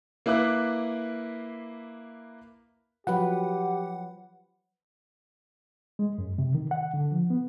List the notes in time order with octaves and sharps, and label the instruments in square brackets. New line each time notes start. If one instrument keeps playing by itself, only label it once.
[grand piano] A#3 E4 B4 F5 D6 F#6
[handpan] F3 F#3 B4 [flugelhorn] G4 [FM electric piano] F#5
[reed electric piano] G#3
F#2
C3
D#3
F#5
D3
F3
B3